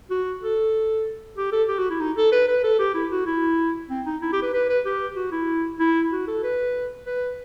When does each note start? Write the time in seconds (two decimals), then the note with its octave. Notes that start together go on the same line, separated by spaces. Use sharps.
0.10 F#4
0.42 A4
1.37 G4
1.52 A4
1.68 G4
1.78 F#4
1.90 E4
2.00 D#4
2.17 A4
2.32 B4
2.48 B4
2.63 A4
2.80 G4
2.94 E4
3.11 F#4
3.26 E4
3.90 C4
4.06 D#4
4.22 E4
4.32 G4
4.43 B4
4.54 B4
4.69 B4
4.85 G4
5.16 F#4
5.32 E4
5.80 E4
6.12 F#4
6.27 A4
6.43 B4
7.06 B4